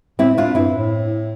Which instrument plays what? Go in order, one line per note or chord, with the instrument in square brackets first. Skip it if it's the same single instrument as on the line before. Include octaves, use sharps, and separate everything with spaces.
[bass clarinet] A2 [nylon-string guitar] C4 E4
[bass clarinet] A2 [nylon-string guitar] D4 F4
[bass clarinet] G2 [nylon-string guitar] C4 E4
[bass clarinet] A2